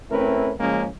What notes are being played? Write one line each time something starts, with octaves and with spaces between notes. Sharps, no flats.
A3 C4 C#4 E4 A#4 B4
C#3 F3 G#3 A#3 C#4